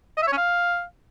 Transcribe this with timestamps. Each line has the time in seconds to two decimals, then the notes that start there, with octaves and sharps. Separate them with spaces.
0.17 D#5
0.22 E5
0.27 C#5
0.32 C#4
0.38 F5